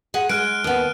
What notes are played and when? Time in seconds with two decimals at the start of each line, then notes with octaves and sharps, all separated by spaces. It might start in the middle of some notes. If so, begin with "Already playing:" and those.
0.14 G#4 F#5
0.29 G#3 F6 F#6 D7
0.64 D#2 B3